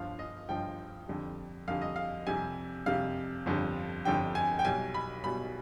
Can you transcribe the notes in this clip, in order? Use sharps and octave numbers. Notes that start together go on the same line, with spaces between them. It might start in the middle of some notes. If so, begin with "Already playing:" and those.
Already playing: G1 G2 F3 F5
D#5
G1 G2 F3 G5
F2 D3 G3
F2 D3 G3 F5
D#5
F5
F2 C3 G3 G#5
F2 C3 G3 F5
G1 F2 D3 G3
G1 F2 D3 G3 G5
G#5
G5
B1 B2 G3 G#5
B5
B1 B2 G3 B5